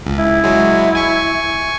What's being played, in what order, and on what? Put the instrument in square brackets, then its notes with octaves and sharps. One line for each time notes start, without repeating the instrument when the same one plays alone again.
[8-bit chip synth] C#2
[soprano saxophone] E4
[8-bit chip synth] F#3 G#3
G#5 C#6